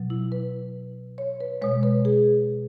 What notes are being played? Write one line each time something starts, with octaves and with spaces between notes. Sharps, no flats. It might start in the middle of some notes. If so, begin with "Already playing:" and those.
Already playing: B2 F#3
E4
B4
C#5
B4
B2 G#3 C#5
B4
G#4